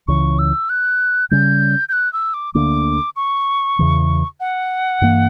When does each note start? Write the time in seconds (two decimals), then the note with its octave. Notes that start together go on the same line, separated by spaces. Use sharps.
0.08 C#2 C#3 E3 C#6
0.39 E6
0.69 F#6
1.31 C#3 G3 C#4 G6
1.89 G6
1.93 F#6
2.13 E6
2.34 D6
2.54 D2 D3 A#3 D4 D6
3.16 C#6
3.79 E2 C#3 E3
4.40 F#5
5.02 G2 E3 A#3